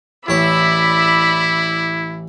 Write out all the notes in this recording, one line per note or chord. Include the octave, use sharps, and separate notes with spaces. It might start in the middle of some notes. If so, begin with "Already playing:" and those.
A1 E4 C#5 D5 B5 E6